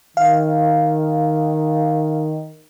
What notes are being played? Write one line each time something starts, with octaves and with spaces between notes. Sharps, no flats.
D#3 F5